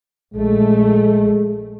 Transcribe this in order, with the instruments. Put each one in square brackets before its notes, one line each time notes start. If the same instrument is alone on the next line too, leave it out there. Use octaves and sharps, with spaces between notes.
[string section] A#1 A3 [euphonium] G#3